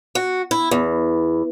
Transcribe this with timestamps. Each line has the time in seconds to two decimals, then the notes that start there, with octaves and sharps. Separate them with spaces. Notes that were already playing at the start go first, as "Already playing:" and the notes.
0.15 F#4
0.51 E4
0.71 E2